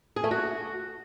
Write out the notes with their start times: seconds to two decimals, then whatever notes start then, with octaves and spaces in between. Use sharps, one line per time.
0.16 G#4
0.24 A3
0.31 F#4